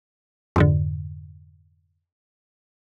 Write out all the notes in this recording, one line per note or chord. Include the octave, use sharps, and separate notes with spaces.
F2 G#2 D3